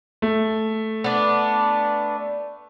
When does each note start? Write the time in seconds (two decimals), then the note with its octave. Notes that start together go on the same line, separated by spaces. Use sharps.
0.22 A3
1.04 B3 D4